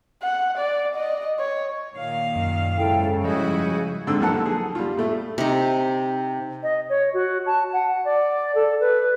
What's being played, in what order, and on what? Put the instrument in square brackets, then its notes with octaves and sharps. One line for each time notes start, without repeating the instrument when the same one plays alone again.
[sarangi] F#5
D5
D#5
C#5
[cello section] A#2 D#3 F5
[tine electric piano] F#2
[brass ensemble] G#2 C#3 [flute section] E4 A4 G5
[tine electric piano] F3 G3 D#5 [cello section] E4 F#4 [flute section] G#4 G6
[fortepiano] G#2 D3 C4 E6
B1 F3 A#3 A4 F#5 A5
G#4
G3 F4
A2 A3
[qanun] C3 D#4
[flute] D#5
C#5
F#4
A5
F#5
D5
A4
B4